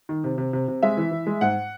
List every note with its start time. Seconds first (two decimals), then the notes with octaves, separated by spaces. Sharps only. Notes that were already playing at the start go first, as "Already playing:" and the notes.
0.09 D#3
0.24 C3
0.38 C3
0.53 C3
0.68 C3
0.83 G#3 E5
0.97 E3
1.11 E3
1.27 G#3
1.41 G#2 F#5